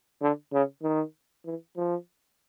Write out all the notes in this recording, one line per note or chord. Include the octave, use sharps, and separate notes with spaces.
D3
C#3
D#3
E3
F3